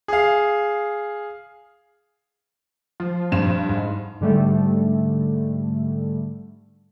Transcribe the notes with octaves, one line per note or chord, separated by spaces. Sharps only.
G#4 F5
F3
G2 C6 E7
G#2
G#2 D3 G3 A3